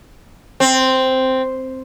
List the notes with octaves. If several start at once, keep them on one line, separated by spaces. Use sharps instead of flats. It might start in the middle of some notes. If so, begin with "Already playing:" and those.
C4